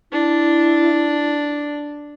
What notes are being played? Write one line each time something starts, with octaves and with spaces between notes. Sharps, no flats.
D4 E4